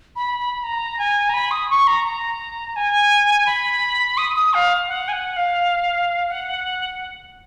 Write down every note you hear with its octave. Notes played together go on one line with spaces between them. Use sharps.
B5
B5
A#5
G#5
A#5
B5
D#6
C#6
A#5
A#5
G#5
B5
D#6
D#6
F5
F#5
G#5
F#5
F5
F#5